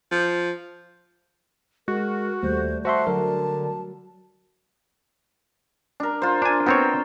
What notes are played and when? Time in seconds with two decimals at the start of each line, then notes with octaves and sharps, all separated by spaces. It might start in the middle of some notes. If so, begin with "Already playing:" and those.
0.12 F3
1.88 G#3 F#4 A#4
2.42 D#2 G3 A3 C5
2.85 F#4 C5 E5 A5 C6
3.07 D3 F#3 A#4
6.00 D4 A#4
6.22 F4 C5
6.42 D4 G#5
6.66 B3 C4 C5 C#5 G5 A#5